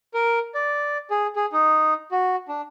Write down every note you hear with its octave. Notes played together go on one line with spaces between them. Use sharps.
A#4
D5
G#4
G#4
D#4
F#4
D4